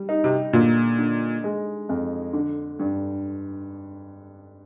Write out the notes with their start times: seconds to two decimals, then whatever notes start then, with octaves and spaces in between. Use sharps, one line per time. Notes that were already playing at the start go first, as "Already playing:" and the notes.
Already playing: G3
0.09 D#4
0.24 C3
0.53 A#2 D3
0.99 D3
1.44 G#3
1.89 F2
2.33 D3
2.79 G2